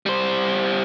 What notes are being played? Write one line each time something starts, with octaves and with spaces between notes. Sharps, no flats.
G3 C5